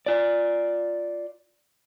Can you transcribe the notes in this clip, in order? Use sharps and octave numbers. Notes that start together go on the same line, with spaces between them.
F4 D5